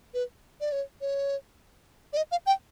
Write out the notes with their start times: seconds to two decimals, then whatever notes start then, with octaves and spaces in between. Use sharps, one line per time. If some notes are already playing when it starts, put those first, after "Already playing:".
0.14 B4
0.61 D5
0.72 C#5
1.01 C#5
2.13 D5
2.17 D#5
2.31 F5
2.46 G5